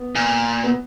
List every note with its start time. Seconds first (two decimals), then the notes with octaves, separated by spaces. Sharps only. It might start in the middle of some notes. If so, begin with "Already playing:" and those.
Already playing: B3
0.15 A#2
0.63 B3